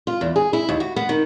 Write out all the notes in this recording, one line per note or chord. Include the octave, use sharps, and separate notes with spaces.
F4
E2
G#4
E4
D#2
F#4
B3
D#3